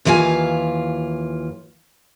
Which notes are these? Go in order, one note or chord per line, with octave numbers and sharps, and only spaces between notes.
D#2 E3 F4 F5 G#5